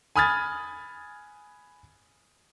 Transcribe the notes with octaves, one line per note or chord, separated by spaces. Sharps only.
G#5 B5 D#6 F6 G#6 A6